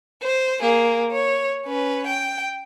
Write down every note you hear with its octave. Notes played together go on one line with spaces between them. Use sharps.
C5
A#3 G#4
C#5
C#4 B4
G5